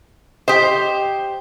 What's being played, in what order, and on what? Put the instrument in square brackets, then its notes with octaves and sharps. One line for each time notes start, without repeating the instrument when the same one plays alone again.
[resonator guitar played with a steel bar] G4 C5 [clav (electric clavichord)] D#5